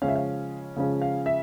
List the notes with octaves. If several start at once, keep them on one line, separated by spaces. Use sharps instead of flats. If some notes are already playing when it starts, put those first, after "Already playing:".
C#3 F3 G#3 C#4 F5
E5
F5
C#3 F3 G#3 C#4
F5
E5